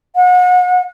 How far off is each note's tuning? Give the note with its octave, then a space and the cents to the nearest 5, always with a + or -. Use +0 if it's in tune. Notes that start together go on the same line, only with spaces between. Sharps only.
F#5 -35